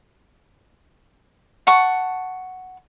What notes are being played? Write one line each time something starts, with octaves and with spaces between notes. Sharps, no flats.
F#5 A5 C#6